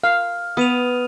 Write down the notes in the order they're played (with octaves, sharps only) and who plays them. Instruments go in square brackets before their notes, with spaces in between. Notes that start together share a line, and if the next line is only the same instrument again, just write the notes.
[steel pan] F5 [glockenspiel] F6
[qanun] B3 [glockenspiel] D#6 D#7 F7